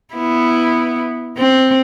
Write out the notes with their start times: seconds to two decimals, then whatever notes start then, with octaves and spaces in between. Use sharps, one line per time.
0.14 B3 E4
1.38 C4